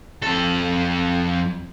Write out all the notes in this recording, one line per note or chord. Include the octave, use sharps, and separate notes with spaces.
F2 A4